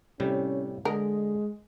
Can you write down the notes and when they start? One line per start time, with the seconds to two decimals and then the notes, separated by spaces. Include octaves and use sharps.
0.20 A2 C3 G3 C#4
0.85 D3 G#3 A#4 D#5